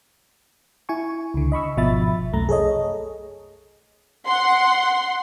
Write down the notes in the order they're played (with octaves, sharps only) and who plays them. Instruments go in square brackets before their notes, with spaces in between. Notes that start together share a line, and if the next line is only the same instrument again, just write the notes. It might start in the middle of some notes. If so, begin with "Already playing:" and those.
[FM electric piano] E4 G#5 C#6
C#2 D3
D#5 B5 C#6 E6
G#1 B2 F3 E5 B5 A6
C2 F#2 A3 A#5
G#4 A4 C#5 D#5
[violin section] F#5 C6